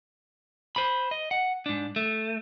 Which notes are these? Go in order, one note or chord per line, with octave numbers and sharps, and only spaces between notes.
C5 B5
D#5
F#5
G#2 D4
A3